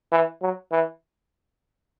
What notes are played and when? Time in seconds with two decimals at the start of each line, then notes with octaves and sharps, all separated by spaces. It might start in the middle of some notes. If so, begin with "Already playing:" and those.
0.12 E3
0.42 F#3
0.72 E3